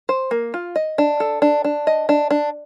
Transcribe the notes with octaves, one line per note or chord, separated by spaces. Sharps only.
C5
A#3
F4
D#5
D4
A4
D4
D4
D#5
D4
D4